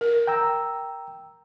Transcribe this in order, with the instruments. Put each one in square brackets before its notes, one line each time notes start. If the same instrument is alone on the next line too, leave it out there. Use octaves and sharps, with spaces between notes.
[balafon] A#4
[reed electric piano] G5 A#5 E6